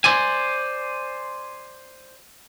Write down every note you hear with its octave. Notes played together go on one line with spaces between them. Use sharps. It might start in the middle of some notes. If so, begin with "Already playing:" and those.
C5 D5 G#5